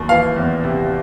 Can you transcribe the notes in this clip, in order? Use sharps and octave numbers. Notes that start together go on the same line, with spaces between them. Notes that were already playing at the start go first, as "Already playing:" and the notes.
Already playing: D#2 F#3
E3 F5
E2
C3